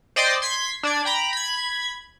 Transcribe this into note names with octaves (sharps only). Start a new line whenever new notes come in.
C5 D5 D#5 G5 A6 C7
C6 G#6 B6
D4 D5 G#6
G5 A#5 B5
B5 G#6